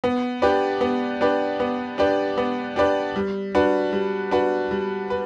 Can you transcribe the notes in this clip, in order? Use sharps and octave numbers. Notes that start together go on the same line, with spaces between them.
B3
D4 G4 B4 D5
B3
D4 G4 B4 D5
B3
D4 G4 B4 D5
B3
D4 G4 B4 D5
G3
D4 F#4 B4
G3
D4 F#4 B4
G3
B4